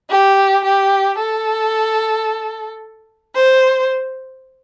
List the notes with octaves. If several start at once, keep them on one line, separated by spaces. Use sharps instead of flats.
G4
G4
A4
C5